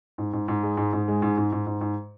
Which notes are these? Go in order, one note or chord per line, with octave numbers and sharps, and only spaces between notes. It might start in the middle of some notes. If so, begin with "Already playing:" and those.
G#2
G#2
G#2
G#3
G#2
G#2
G#3
G#2
G#2
G#2
G#2
G#2